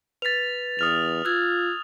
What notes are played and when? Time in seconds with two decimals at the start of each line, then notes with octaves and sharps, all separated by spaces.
0.22 B4 A6 B6 F7
0.79 E2 D#6 F6 F7
1.25 F4 E6 F#6 G#6